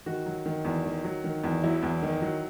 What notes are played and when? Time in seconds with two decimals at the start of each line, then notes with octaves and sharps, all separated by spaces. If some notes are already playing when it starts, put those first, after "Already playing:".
0.06 D#3 F#4
0.26 F#3
0.46 D#3
0.65 E2
0.85 D#3
1.04 F#3
1.24 D#3
1.44 E2
1.63 F#3 E4
1.83 E2
2.03 D#3
2.22 F#3